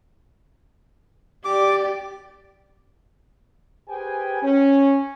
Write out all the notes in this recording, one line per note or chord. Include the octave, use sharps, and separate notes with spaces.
G4 D5 D6
G4 G#4 B4 C5 G5 G#5
C#4